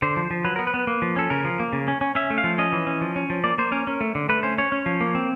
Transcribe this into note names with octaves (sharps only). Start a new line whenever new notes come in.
D3 C5
F3
F3
F#3 B4
B3 A#4
B4
B3
A#3
F3
C#4 A4
C#3 A#4
F3
A#3
C#3
C#4
C#4
C#4 E5
A3
F5
F3
C#4 D#5
E3
C#4
F3
C#4
F3
A#3 D5
A#3 C5
C#4 A#4
C#4
A3
D3
A3 B4
C#4 C5
C#4 C#5
C#4
F3
A#3
C4